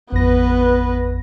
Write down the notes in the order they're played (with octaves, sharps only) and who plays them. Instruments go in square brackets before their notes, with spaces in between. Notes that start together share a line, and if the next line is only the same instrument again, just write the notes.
[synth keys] A1 F2 A#6 [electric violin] B3 B4